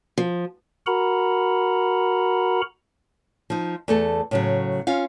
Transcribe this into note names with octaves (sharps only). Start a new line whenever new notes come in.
F3
F#4 A#4 F#5 A#5 B5
F3 D#4
E2 A3 A4
A2 C#3 F#3
C#4 F4 F5